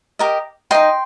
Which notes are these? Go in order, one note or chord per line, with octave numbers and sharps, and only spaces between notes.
G4 A#4 D#5
D#4 C5 D#5 G5 C6